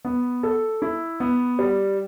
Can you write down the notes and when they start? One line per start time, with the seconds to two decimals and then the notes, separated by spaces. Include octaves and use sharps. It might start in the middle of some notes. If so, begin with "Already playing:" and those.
0.05 B3
0.43 A4
0.82 E4
1.20 B3
1.59 G3